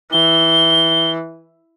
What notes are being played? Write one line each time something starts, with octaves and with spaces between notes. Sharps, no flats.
E3 G7